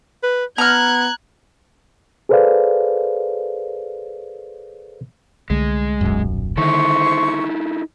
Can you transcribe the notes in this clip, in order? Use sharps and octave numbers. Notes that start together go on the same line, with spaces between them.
B4
B3 A#5 F6 F#6 G#6
G#4 A4 B4 C5 D5 F5
C2 D3 G#3 A3
D#1 B1 F#2
D3 D#3 D#4 E4 A4 C5 C6 C#6